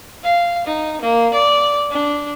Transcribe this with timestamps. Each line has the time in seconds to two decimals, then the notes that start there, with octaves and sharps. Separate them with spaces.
0.24 F5
0.66 D#4
1.01 A#3
1.33 D5
1.91 D4